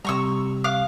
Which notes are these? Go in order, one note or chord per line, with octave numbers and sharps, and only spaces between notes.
C3 G3 A#5 C#6 E6
F5 D6 F#6